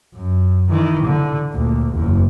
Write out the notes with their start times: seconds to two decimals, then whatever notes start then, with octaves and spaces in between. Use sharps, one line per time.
0.16 F#2
0.70 D#3 E3
1.05 D3
1.53 D2 A#2
1.96 F#1 E2